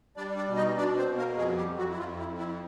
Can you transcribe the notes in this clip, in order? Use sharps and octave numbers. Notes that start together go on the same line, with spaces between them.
G3 D4 D5
D4 D5
B2
D#4 D#5
B2 D4 D5
C4 C5
B2
A#3 A#4
F2 G#3 G#4
G3 G4
F2
F#3 F#4
E4
F2 F4
E4
F2
E4